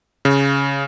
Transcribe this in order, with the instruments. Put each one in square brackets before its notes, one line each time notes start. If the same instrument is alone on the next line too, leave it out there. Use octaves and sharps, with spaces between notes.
[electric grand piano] C#3